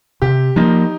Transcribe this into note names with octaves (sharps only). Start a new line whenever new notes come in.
C3 G4
F3 A#3 D#4